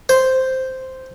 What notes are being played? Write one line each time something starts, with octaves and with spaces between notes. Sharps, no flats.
C5